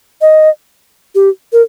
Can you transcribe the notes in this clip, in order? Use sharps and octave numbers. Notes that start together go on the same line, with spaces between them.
D#5
G4
A#4